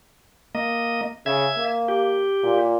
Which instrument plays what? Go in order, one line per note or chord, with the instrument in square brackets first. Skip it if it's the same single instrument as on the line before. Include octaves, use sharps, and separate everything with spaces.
[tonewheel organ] A#3 D#5
[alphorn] C#3 [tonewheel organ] E5 G#6
[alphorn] A#3
[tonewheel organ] G4
[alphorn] A#2